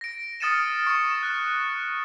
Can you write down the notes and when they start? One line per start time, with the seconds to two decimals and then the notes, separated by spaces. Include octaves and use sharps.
0.01 A#6 D7
0.40 D#6 F6 A6 C#7 D#7 E7
0.87 C#6 C#7
1.08 E7
1.23 F#6